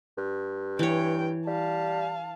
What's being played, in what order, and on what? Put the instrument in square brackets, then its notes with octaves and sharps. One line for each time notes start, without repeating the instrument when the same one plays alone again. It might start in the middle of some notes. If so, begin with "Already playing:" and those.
[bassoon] G2
[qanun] E3 C#5 [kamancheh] G5
[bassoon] G3 [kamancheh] F5 A5